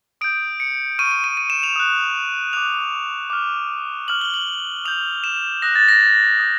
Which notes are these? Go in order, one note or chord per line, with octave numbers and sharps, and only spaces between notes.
D#6 G6 D7
C#7
C#6 F6 D#7
D#7
D#7
D#7
E7
F7
D#6 F#6
D6 F#6 F7
D6 F6
D6 F6 F#7
G7
F#7
D#6 G6 F7
E7
D#6 F#6 A#6
A6
A#6
A#6
D#6 G6